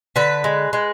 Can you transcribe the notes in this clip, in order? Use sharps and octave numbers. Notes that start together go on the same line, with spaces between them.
D3 B4
G#3
G#3